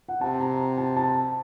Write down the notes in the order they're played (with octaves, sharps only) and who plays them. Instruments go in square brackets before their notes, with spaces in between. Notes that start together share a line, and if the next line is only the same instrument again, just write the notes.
[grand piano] F#5
[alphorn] C3 [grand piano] A5
[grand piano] A#5
A5
A5